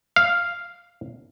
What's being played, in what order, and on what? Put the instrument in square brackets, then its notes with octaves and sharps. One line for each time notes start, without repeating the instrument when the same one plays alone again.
[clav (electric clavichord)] F5